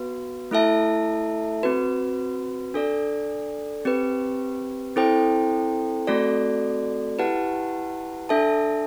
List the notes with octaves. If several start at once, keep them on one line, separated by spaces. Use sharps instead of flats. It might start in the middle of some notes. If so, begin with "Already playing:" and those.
Already playing: B3 F#4 B4
A3 E4 A4 E5 A5
C4 F#4 B4
D4 A4 D5
C4 G4 B4
C4 E4 A4 C5 G5
A3 C4 F#4 A4 D5
E4 G4 B4 F#5 A5
D4 A4 E5 A5